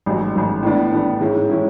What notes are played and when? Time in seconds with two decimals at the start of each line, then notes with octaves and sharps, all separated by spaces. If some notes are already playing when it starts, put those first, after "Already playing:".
0.06 A1 G#2 F#3
0.35 A1 G#2 F#3
0.63 A2 E3 B3 D4
0.92 A2 E3 B3 D4
1.20 G#2 E3 G#3 C#4 E4
1.49 E3 G#3 C#4 E4